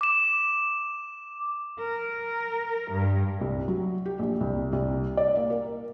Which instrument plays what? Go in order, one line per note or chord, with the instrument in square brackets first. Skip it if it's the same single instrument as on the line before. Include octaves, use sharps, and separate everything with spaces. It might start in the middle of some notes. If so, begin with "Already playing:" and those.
[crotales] D6 E7
[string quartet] A#4
G2
[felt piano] C2
F#3
G4
A#1
C2
C2
D5
A#3
A#4